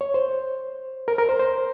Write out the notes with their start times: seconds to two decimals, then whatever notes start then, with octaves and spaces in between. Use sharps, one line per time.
0.01 C#5
0.14 C5
1.08 A#4
1.18 A#4
1.29 C5
1.39 C5